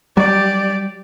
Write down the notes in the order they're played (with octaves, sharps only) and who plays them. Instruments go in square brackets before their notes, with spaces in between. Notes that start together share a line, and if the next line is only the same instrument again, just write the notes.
[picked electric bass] F#3 G3 [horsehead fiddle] G4 D5